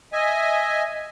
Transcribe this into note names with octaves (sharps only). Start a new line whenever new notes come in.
D#5 E5 G#5